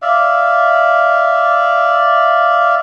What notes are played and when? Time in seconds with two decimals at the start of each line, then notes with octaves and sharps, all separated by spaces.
0.02 D5 E5 F5